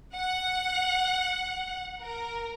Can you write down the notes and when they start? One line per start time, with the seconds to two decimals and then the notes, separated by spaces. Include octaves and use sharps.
0.14 F#5
2.01 A#4